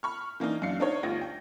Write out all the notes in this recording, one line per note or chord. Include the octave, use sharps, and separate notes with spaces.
B5 C#6 F6
E3 A#3 D4 D#4
F#2 D4 F5 C7 C#7
D4 D#4 C#5
G1 D2 F4 A#6
G5